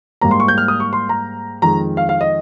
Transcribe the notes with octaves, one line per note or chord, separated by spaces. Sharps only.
G#2 G3 A#3 A#5
C6
C#6
G6
F6
D#6
C#6
C6
A#5
F2 D#3 G#3 A#5
F5
F5
D#5